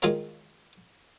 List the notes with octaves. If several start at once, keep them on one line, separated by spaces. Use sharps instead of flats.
D#3 G#3 F4 G#4 A#4 C#5